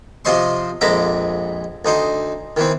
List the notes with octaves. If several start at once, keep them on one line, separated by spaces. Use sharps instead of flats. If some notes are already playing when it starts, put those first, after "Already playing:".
C3 F3 C5 D#5 C6 C#6
A#1 F2 G#3 E5 A#5 D6
D2 D#4 C5
D#3 E3 C4